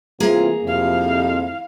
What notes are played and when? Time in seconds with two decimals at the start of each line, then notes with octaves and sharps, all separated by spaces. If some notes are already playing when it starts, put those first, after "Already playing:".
0.20 C3 E3 A#3 F4 G#4 A#5
0.64 F2 C3 E4 F5